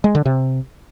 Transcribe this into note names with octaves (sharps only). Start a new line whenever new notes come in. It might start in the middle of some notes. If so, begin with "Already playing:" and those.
G#3
D3
C3